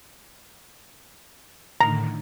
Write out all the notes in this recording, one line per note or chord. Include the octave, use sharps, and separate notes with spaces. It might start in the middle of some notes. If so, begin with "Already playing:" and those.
A2 D3 D#3 A#5